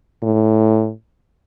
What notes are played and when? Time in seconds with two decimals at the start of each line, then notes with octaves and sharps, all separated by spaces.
0.23 A2